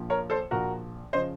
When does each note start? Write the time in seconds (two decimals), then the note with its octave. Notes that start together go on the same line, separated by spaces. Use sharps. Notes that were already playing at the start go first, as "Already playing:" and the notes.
Already playing: A#1 A#2 F3
0.10 A#4 C#5
0.30 A4 C5
0.51 A#1 A#2 F3 F#4 A#4
1.13 C#3 F3 C5 D#5